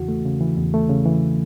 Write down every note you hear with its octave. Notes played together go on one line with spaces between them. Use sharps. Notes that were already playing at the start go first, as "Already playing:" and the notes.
Already playing: E2 C#3 E3 F#4
A3
C#3
E3
E2
A3
C#3
E3